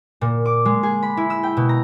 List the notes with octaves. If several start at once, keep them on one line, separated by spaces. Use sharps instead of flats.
A#2
D6
G#3
G#4
B5
E4
E6
G5
B2
A#5